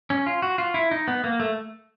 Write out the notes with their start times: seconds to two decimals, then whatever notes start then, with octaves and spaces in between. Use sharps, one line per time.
0.10 C#4
0.26 F4
0.42 F#4
0.58 F4
0.74 E4
0.91 D#4
1.08 B3
1.24 A#3
1.40 A3